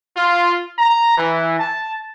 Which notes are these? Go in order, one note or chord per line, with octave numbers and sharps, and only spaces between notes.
F4
A#5
E3
A5